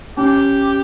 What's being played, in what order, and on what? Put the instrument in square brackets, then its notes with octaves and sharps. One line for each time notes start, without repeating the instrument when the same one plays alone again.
[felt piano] C#4 [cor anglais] G4